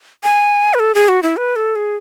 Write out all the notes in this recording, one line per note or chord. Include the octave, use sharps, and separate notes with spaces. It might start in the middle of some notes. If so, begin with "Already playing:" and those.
G#5
B4
A4
G#4
F#4
E4
B4
A4
G#4